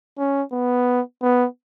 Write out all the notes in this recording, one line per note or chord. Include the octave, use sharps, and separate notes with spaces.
C#4
B3
B3